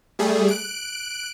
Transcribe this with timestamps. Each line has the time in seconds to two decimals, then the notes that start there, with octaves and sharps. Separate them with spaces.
0.19 G3 A3 G#4
0.48 F#6 D7